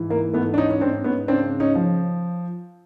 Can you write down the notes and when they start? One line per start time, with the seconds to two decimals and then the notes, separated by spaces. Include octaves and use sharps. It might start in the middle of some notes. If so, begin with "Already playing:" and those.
Already playing: G#2 E3
0.10 A#3
0.33 G#2 A3 B3
0.54 D4
0.58 C#4 D#4
0.70 C#4
0.81 G#2 C4 D4
1.04 B3 C#4
1.28 C#3 C4 D4
1.60 C#4 D#4
1.75 F3